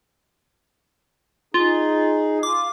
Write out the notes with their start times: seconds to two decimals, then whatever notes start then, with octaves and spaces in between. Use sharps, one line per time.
1.54 D#4 F4 G#4
2.43 F4 D6